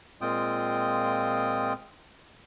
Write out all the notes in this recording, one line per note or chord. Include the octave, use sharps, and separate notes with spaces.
A#2 G#3 C4 F4 G5 D#6